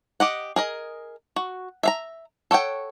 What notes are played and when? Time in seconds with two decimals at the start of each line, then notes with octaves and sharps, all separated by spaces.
0.20 G4 D#5 F#5
0.56 G#4 A#4 D#5
1.36 F#4
1.83 E5 F5 A#5
2.51 A4 C#5 F#5 G5